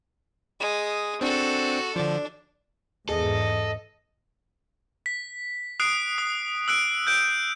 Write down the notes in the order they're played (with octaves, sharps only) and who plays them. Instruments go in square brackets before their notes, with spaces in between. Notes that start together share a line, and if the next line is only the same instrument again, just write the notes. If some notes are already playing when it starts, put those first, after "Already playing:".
[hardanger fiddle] G#3 D#6
[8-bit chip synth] C4 D4 [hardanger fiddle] F#4 A4
[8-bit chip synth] D3 F3 [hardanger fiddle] D4
[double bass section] E2 G#2 [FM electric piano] G#4 [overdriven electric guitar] A4 [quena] D#5
[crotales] B6
D#6 F#6 C7 D7
D#6
E6 F#6 D7
F#6 G6 D7